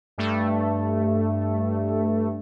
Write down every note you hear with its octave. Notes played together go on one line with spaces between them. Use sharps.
G2 A3